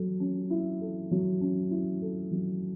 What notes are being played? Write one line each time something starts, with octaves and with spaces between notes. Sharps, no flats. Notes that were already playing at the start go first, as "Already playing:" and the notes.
Already playing: F#3 A4
C#4
E4
A4
F#3
C#4
E4
A4
F#3